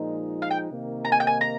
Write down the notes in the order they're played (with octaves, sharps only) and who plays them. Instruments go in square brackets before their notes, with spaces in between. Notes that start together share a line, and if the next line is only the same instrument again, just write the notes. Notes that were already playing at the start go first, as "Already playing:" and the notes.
Already playing: [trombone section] A#2 F3 G#3 D#4
[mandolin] F5
G5
[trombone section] C3 D#3 A#3 D#4
[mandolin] A#5
G#5
G5
G#5
A#5